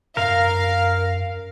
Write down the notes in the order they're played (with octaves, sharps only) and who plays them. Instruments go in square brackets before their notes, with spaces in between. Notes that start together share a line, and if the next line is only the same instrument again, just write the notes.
[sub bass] F#2 [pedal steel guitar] A#4 [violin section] F5